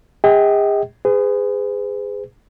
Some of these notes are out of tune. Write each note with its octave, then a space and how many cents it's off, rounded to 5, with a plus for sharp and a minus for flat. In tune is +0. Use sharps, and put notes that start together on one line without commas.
G#4 -40 D#5 +40 G5 -30
G#4 -15 B4 +40